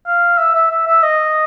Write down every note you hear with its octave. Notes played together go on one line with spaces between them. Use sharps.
F5
E5
E5
E5
E5
D#5